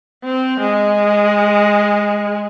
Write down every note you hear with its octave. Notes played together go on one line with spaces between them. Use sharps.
C4
G#3